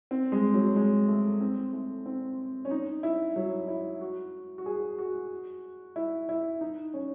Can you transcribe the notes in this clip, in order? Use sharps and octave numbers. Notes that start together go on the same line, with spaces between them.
C4
G#3
F#3
G#3
A3
C4
A3
C4
C#4
D#4
E4
F#3
E4
F#4
F#4
G#4
F#4
E4
E4
D#4
C#4